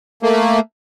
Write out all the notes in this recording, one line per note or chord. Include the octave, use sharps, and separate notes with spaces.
A3 A#3